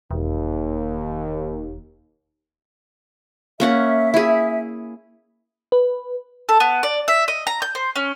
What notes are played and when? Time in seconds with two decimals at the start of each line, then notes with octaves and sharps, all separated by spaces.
0.11 E1 D#2
3.60 A#3 C#4 E5 F#5
4.14 E4 G#4
5.72 B4
6.49 A4
6.60 B3
6.83 D5
7.08 E5
7.28 D#5
7.47 A#5
7.62 G6
7.75 C5
7.96 C#4